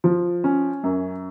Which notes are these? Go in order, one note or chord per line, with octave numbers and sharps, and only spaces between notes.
F3
C#4
F#2